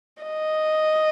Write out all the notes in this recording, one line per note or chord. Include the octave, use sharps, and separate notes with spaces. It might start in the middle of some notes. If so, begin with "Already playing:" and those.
D#5